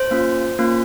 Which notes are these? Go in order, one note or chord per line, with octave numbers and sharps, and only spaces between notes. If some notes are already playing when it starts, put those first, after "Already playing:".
Already playing: C5
A#3 C#4 F4
A#3 C#4 F4